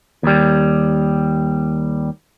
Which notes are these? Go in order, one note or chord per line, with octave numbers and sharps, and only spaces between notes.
D#2 G3